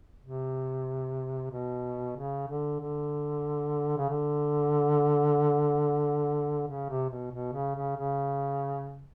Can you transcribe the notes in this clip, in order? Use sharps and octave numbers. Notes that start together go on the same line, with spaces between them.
C3
B2
C#3
D3
D3
C#3
D3
C#3
C3
B2
B2
C#3
C#3
C#3